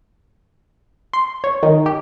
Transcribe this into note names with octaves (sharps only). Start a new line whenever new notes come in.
C6
C#5
D#3
G4